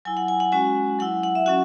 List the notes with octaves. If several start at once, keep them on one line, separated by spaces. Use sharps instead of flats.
F#3 E4 G#5
F#5
G#5
F#5
G#3 C#4 F#4 G#5
F#3 E4 F#5
F#5
E5
F#3 C#4 F#4 F#5